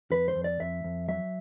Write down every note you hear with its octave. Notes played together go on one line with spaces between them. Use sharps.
F2 B4
C5
F2
D5
F2 E5
F2
F#3 E5